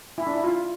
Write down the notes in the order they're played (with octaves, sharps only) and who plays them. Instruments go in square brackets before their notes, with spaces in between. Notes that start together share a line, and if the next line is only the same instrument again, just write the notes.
[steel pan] E4
D4
E4
F4